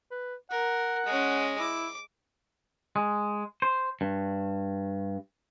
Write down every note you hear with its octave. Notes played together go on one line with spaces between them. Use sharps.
B4
A#4 F#5
G#3 C#4
E4 D6
G#3
C5
G2